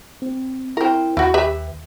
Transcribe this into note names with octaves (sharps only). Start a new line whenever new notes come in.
C4
C4 E4 A#4
D#2 E4 F#4
G4 B4 E5